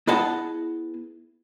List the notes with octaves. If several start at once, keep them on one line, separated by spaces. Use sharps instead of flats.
B3 E4 G#4 D#5 F#5 A5